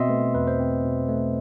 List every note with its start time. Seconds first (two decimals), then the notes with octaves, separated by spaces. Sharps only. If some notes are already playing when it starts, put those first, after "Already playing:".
Already playing: B2 C4 D#5 E5 C6
0.09 A3 B4
0.35 E2 B4
0.47 C5
0.60 C4
0.85 B2
1.09 A3